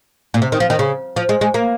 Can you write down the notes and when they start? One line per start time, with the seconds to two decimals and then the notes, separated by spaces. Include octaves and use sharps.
0.34 A#2
0.42 C3
0.52 D#3
0.60 F3
0.70 D#3
0.79 C#3
1.16 F3
1.29 G#3
1.41 G#3
1.54 A#3